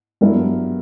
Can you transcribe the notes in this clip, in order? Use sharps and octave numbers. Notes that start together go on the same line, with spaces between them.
G2 F#3 B3 E4 A#4